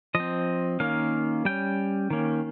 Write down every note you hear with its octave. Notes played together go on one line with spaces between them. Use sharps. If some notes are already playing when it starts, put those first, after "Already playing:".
F3 D#5
C4
D#3 A#3 C#4 F5
G3 C#4 G5
D#3 A#3 C#4